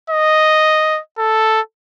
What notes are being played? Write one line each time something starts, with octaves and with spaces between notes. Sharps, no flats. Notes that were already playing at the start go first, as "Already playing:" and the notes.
D#5
A4